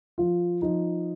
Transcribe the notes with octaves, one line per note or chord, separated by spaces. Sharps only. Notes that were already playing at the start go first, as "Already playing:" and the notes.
F3 F4
F3 D#4